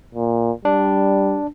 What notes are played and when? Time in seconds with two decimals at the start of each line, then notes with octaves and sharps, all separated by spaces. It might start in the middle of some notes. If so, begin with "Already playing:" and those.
0.15 A#2
0.65 G3 D4